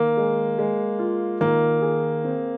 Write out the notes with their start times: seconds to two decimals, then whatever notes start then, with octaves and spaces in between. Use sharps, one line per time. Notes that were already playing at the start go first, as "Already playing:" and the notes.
Already playing: D#3 A#3
0.17 G#3
0.59 G#3
0.99 F4
1.41 D#3 A#3
1.82 G#4
2.24 C4